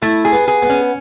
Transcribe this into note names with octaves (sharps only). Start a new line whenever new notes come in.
A3 E4
G#4
B3
G#4
B3
C#4